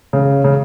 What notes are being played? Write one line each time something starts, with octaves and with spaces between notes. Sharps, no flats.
C#3
C#3